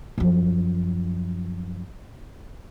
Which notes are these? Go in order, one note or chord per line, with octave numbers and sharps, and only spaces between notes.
F#2 F3